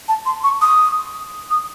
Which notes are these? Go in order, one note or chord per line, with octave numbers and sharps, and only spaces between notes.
A5
C6
C#6
D#6
D#6